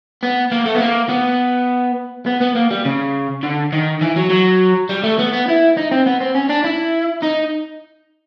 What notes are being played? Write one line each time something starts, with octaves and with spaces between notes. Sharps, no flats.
B3
A#3
A3
B3
A#3
B3
B3
B3
A#3
G3
C#3
D3
D#3
E3
F#3
F#3
G3
A3
B3
B3
E4
D#4
C4
B3
C4
C#4
D4
E4
D#4